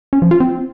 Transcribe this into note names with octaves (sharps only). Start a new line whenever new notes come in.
C#4
F3
F4
C4